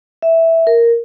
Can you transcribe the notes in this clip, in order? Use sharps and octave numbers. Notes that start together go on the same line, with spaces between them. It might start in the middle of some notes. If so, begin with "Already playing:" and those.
E5
A#4